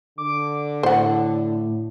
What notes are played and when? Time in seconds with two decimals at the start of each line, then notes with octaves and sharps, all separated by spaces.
0.18 D3 D6
0.83 A2 C5 F#5